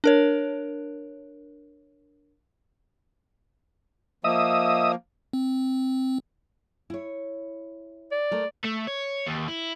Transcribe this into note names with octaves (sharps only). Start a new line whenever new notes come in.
D4 A#4 C#5
F3 A#3 D#5 E5 D#6
C4
E4 C#5
D5
A3 A#4
A3
C#5
D#2
E4